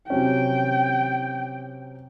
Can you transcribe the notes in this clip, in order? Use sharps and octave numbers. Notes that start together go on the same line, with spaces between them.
C3 F#3 C#4 G5